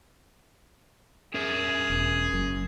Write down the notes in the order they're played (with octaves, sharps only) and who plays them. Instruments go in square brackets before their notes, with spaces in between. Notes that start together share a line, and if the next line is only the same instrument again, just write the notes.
[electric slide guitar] C#4 A#4 E5 [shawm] G#4
[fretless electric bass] E1
F#1 F#2